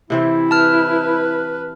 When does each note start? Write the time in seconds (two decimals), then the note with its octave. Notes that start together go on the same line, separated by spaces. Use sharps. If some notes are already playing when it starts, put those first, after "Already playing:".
0.10 C3 E3 C4 E4
0.51 B4 A5 F6